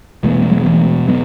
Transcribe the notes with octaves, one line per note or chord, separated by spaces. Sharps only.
E1 E2 B2 E3 A3
A3
F#3 B3
E3 A3
F#3 B3